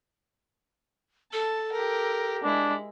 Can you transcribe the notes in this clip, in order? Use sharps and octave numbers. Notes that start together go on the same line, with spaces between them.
A4 A5
G4 A#4
G#3 D4 E4